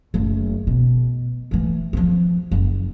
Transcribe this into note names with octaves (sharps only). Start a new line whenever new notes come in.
F#1 A3
B2
E3 A3
F3 C4
F#1